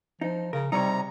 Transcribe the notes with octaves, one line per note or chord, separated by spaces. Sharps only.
F3 D#4
C#3 A#4
C3 G3 D#4 C#5 A#5